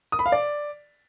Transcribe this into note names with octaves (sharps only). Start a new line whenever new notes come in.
D#6
B5
F5
D5